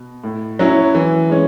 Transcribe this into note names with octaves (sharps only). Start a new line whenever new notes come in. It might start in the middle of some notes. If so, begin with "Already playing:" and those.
Already playing: B2
A2
F#3 C#4 E4
E3
G#3 C#4